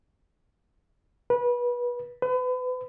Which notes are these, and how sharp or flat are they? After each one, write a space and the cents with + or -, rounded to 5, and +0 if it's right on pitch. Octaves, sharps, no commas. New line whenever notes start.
B4 -25
B4 +35